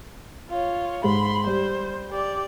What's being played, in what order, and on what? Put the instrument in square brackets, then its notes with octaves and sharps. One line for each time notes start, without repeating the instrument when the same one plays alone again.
[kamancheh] F4 C#5
[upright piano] G#2 [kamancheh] B5 C6
[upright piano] G3 [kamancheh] C5
[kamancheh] G4 D5